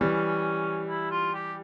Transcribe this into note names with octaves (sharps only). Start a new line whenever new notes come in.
E3 G3 C#4
E4
F4
G4